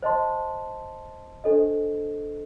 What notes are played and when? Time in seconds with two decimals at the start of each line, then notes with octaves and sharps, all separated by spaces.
0.03 C5 D#5 A5 C6
1.44 D4 A4 C5 D#5